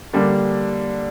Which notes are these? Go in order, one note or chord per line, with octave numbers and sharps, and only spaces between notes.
D3 G3 A#3 D4